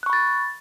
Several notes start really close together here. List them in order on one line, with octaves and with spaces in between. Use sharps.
F#6 C#6 B5 A6